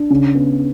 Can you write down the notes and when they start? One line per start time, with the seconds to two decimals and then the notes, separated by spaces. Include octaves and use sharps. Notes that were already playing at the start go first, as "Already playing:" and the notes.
Already playing: D4
0.10 C#3
0.35 B3